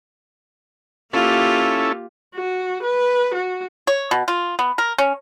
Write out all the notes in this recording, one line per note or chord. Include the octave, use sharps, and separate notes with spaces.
A#3 C#4 E4 F4 G4 A4
F#4
B4
F#4
C#5
B2
F4
B3
A#4
C#4